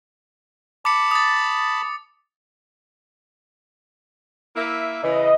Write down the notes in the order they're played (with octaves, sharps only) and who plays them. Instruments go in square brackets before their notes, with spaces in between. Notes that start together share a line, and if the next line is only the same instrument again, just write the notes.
[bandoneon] A5 B5 [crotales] D6 C#7
[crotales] D#6 A6
[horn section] A#3 E4 E5
[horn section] C#3 E3 [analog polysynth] D#5